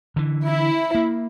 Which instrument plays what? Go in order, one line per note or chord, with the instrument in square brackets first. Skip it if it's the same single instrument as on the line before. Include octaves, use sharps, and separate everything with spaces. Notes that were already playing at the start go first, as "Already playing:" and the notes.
[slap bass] D3 E3
[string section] E4
[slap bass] A#3